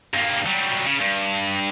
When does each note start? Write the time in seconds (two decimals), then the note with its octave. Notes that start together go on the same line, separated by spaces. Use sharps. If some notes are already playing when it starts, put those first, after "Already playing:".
0.14 G2 A#3
0.46 F#3 G3
0.87 C#3
1.01 G2